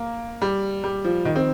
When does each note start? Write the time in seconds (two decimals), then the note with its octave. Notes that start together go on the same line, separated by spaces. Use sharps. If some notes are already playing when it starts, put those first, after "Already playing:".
Already playing: A#3
0.42 G3
0.84 G3
1.04 F3
1.25 D#3
1.36 C4